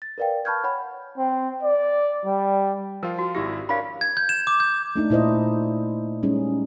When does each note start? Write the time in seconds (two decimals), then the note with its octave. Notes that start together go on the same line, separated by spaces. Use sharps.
0.02 A6
0.18 A#4 B4 D5 F5 G5
0.45 A5 B5 C#6 F6 G6 G#6
0.64 C#5 F#5 G#5 B5
1.18 C4
1.63 D5
2.25 G3
3.03 F3 F4 A#4
3.19 F#4
3.35 G#1 E4 G4 A#6
3.69 D4 A#4 C#5 F5 B5
4.01 G#6
4.17 G6
4.29 E7
4.47 D6
4.60 G6
4.96 A3 D4 D#4
5.10 A#2 E4 C5 D#5
6.23 G3 G#3 C#4 D#4 G#4